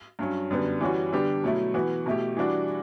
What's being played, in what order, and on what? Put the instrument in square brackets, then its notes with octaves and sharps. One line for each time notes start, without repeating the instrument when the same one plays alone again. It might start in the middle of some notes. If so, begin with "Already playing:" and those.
[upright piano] G2 F#3 C#4
F#2 D3 G3 B3
E3 G3 C#4 F#4
D3 G3 B3 D4 G4
B2 F#3 A3 E4
E3 B3 F#4
B2 A3 E4 G4
E3 G3 D4 F#4